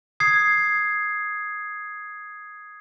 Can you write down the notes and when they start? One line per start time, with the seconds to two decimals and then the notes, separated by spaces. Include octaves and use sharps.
0.20 D#6 G#6 C7